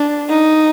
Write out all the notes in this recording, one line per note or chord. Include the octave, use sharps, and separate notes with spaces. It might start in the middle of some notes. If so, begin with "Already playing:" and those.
Already playing: D4
D#4